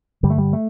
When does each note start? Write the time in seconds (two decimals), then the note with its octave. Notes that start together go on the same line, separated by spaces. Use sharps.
0.23 G2 D3 G3
0.30 A3
0.38 G3
0.53 A3